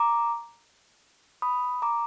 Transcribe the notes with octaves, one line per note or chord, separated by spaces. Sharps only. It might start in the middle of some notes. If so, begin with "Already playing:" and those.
Already playing: A#5 D6
B5 D#6
A#5 D6